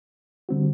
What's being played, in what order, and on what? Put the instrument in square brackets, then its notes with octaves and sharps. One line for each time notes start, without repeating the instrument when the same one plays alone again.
[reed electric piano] D3 G3 C4 F#4